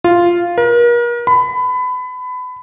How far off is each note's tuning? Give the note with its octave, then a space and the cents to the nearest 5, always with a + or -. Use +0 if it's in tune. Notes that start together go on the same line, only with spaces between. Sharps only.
F4 -5
A#4 +40
B5 +25